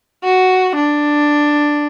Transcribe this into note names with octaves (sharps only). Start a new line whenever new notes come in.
F#4
D4